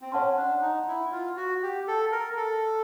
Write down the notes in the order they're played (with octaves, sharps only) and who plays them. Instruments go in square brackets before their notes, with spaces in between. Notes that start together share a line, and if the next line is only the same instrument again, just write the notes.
[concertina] C4
[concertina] C#4 [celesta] C#5 F#5 A5 C6
[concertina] D4
D#4
E4
F4
F#4
G4
A4
A#4
A4